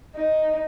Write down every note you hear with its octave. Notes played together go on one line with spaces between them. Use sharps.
D#4